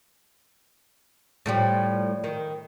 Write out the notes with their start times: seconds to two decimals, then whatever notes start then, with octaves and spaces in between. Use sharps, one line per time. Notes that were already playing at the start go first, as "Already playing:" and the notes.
1.46 A2 F3 G3
2.24 D#3